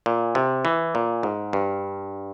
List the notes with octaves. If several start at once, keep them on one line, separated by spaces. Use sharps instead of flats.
A#2
C3
E3
A#2
G#2
G2